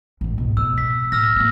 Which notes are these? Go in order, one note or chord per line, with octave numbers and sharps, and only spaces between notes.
A1 G#2
G#2 B2
B2 E6
B6
A2 E6 F6 A#6
G#3 A#3